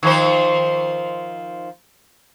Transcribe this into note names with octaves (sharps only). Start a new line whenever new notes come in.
D#3 F3 C5